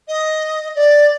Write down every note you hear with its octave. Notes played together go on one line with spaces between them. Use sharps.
D#5
D5